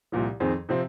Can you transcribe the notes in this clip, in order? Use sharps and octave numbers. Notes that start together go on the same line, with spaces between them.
C2 A#2 F3
F2 D#3 C4 G#4
C3 F3 C4